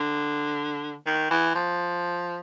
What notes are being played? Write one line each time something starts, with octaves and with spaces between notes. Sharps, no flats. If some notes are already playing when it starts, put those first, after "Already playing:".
Already playing: D3
D#3
E3
F3